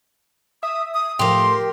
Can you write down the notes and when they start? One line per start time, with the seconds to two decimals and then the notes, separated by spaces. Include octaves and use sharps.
0.63 E5 D#6
0.94 D#6
1.19 A2 F3 G4 A#4 C6